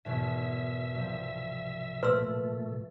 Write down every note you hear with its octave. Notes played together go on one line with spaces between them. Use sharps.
G#1 E2 B2 E5
C2 F3
A#2 A3 B4 C6 E6 A#6 B6